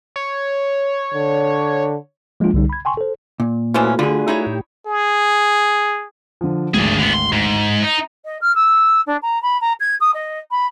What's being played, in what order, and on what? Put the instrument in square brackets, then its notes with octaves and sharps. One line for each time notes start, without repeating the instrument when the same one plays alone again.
[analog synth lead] C#5
[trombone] D3
[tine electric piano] F3 G#3 A#3 D4 F4
C2 D3 G3 D#4
B5 G#6
G5 G#5 C6 C#6
A4 C5
[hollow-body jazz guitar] A#2
[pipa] E3 F3 C#4 [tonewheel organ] A3 F#4
[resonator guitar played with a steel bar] D3 [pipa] G3 [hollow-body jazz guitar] F4 G#4
[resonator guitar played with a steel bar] D#4 E4 C#5
[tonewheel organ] A2 G4
[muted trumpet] G#4
[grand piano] D3 F3
[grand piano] G#1 D2 [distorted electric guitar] D4 G#4
[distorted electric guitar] D3 B3
C6
G#2
D#4
[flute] D#5
F6
E6
D4
A#5
B5
A#5
G#6
D#6
D#5
B5